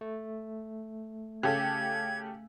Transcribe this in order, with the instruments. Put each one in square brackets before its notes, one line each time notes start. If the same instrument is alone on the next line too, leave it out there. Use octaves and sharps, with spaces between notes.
[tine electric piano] A3
[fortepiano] C#3 [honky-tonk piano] G4 A4 [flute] G#6